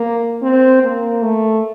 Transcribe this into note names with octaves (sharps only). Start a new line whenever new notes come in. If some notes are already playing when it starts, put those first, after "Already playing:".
Already playing: A#3
C4
A#3
A3